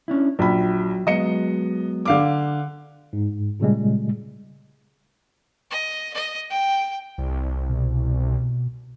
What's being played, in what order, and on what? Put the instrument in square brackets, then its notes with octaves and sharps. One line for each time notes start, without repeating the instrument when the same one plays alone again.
[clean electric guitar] C#4 D4 E4
[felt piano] A#1 B5 [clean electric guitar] F#3
[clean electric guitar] F#3 G#3 B3 [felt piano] D#5 C#7
[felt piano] D3 F5 D6
[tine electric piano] G#2
A#2 C#3 G3 G#3
[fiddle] D#5
D#5
G5
[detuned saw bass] C2
[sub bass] B2